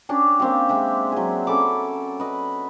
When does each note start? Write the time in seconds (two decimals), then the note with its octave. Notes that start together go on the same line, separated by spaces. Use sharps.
0.09 C#4 D4 G4
0.40 A#3 C4 G4
0.69 G#3 G4 E5
1.12 F#3 G#4
1.47 C#4 A4 B5 D6
2.20 B4 D#5